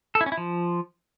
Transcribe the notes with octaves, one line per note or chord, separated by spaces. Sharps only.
A4
E4
C#4
E4
F3